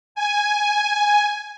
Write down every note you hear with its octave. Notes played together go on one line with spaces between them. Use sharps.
G#5